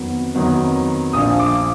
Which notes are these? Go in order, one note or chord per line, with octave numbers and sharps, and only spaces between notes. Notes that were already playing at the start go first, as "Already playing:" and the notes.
Already playing: F2 D#3 F#3 B3
F2 D#3 F#3 B3
A#1 A#2 F3 D#6
D6